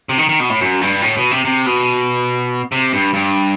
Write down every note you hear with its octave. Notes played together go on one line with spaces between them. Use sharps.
C3
D#3
D#3
B2
A2
F#2
G2
A2
B2
C3
C3
B2
C3
G2
G2